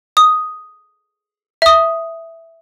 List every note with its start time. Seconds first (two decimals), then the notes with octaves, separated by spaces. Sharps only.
0.17 D#6
1.62 E5 D#6